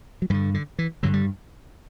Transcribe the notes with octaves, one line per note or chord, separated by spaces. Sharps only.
F#3
G2 D3 E3
D3
E3
G2 D3 F#3
G3